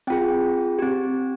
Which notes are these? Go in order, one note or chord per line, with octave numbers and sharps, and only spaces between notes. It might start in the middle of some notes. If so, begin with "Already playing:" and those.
C4 F4 G#4 G5
C4 G4